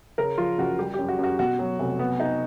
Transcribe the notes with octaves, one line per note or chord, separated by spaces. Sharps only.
C#3 A#4
F3 F4
F#1 F#4
G3 G4
F#2 G4
F#4
F#2 F#4
B2 F#4
F#3
F1
B3
D#4